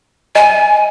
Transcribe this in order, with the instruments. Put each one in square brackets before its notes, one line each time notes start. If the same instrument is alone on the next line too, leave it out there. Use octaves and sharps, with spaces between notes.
[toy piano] D#5 [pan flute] G#5